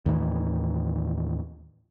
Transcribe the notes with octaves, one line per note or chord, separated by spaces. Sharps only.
D#2 A2 D#3 E3